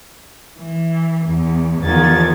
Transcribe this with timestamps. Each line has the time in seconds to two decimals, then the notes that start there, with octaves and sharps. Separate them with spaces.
0.59 E3
1.26 E2
1.81 E2 D3 D#3 F3 G#6 A6